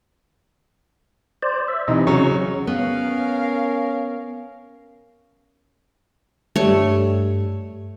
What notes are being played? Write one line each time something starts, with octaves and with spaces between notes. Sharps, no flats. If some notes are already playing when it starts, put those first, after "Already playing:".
C5 D5
E5
C3 E3 D#4 D#5
C#3 F#3 C#4 C#6
B3 C#4 A#4 F5
G2 G3 A3 C#5